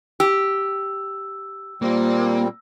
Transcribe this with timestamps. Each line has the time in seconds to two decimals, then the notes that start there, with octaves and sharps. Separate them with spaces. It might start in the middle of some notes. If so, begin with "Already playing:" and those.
0.20 G4 E6
1.82 A#2 G3 A#3 C4